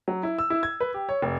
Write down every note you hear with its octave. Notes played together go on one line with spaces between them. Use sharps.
F#3
E4
E6
E4
G#6
B4
G4
C#5
F1